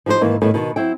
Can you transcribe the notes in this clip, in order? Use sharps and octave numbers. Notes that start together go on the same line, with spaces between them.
F3 G3 D#4 B4 C5
G#2 D#3 E3 A#3
A2 D#3 G3 B3
B2 D#3
F#3 C4 E4 G5